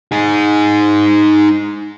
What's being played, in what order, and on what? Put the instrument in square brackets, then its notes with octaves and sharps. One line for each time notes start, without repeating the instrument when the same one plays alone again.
[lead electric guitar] D#4 G#4